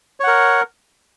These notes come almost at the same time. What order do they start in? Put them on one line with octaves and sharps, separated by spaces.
C#5 F#5 A#4